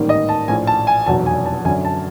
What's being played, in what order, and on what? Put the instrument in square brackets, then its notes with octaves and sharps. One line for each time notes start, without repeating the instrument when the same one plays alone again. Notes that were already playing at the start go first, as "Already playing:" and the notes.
Already playing: [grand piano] A1 G#2 D#3 G3 A#3
D#5
A5
A#1 A2 F3 G#5
A5
G#5
F1 E2 B2 F#3 A5
G#5
A5
F#2 D3 F#3 G#5
A5